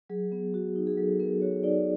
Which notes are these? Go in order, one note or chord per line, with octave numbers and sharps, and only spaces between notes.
F#3 G#4
B3
F#4
D#4
G#4
F#3 A4
B3 A#4
F#4 C#5
D#4 D5